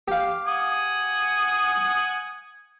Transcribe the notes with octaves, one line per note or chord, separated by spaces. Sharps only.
G4 F5
F#5 G#5 D#6